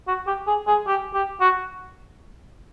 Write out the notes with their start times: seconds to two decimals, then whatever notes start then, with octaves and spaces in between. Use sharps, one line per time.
0.08 F#4
0.27 G4
0.47 G#4
0.67 G#4
0.87 G4
1.14 G4
1.41 F#4